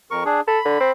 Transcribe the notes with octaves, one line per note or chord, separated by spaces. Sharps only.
F2 A#4 C#6
D4 G#4
A4 B5
D3
C4